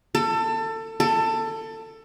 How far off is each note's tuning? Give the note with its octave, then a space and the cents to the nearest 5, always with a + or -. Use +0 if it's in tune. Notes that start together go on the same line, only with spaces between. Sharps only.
A4 +25
A4 +20